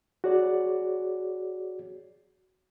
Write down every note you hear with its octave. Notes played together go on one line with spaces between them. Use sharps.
F#4 G#4 C#5 D5